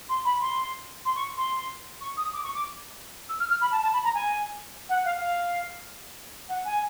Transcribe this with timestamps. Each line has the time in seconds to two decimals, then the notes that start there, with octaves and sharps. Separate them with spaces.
0.09 C6
0.25 B5
0.41 C6
1.05 C6
1.16 C#6
1.37 C6
2.01 C#6
2.17 D#6
2.33 D6
2.43 C#6
2.54 D6
3.29 E6
3.40 F6
3.50 F6
3.61 B5
3.72 A5
3.83 A5
3.93 B5
4.04 A#5
4.14 G#5
4.89 F#5
5.05 F5
5.21 F5
6.49 F#5
6.65 G#5